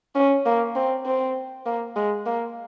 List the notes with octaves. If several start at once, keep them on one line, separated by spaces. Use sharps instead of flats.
C#4
A#3
C4
C4
A#3
G#3
A#3